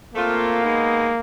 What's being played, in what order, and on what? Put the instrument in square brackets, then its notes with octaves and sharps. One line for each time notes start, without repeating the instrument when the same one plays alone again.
[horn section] A3 C4 F4 [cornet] A#3
[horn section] G#3 B3 D#4